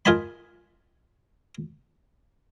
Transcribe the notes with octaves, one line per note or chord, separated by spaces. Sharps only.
F4 A#4 D#5 G#5 A5 B5